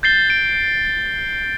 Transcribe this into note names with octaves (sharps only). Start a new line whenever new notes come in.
G6 A6 C7 G7
D7